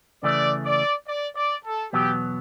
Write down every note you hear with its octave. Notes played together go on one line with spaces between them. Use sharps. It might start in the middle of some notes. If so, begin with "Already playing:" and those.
C#3 E3 A3 D5
D5
D5
D5
A4
E2 B2 F#3 B3 G4